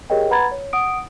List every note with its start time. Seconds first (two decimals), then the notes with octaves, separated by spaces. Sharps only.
0.10 G4 G#4 A#4 C#5 D#5 G5
0.30 B4 F#5 A#5 B5 G#6 A6
0.52 C#5
0.73 F#5 D#6 D7